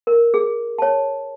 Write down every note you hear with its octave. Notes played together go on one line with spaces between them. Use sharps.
A#4
G#4
C#5 A5